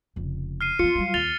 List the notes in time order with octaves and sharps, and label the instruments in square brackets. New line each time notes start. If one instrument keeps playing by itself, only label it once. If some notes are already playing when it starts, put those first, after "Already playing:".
[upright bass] F1 C#3
[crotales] F6 C7 D#7
[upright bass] F3 B3 [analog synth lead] F4 [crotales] C#7
[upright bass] F#3 G3
[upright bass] D#2 [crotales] A6 F7 G7